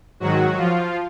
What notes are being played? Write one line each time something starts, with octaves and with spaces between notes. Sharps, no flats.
G#2 D#3 F#3 F#4
F3 F4